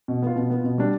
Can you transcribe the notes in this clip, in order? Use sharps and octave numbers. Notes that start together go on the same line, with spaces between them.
B2
B3 F4
B2
B3 F4
B2
G3 D4